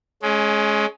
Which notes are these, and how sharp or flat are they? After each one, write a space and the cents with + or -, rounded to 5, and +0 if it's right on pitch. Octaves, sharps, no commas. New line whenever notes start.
G#3 +25 C#4 +0